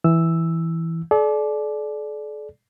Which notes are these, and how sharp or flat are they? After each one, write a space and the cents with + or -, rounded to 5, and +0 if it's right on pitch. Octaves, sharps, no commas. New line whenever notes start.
E3 +0 E6 +0
A4 -45 D5 +0